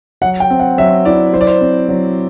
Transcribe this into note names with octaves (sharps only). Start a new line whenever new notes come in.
F#3 F#5
G5
C4
F#5
F#3 E5
E4 D5
F#3 C5
D5
C5
C4
F#3